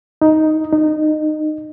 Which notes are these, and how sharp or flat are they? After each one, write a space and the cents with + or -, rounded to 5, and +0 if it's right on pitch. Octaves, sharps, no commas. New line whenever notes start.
D#4 +5
D#4 -20